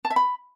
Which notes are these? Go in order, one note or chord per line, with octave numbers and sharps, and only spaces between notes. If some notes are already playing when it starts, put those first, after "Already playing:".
A5
E5
B5